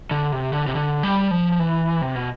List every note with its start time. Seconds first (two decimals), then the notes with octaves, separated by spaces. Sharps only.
0.11 D3
0.32 C3
0.53 D3
0.67 C3
0.75 D3
1.03 G3
1.31 F3
1.59 E3
2.01 C3
2.16 B2